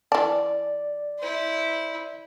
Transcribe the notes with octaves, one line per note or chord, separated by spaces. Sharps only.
E3 D5 A5
E4 C5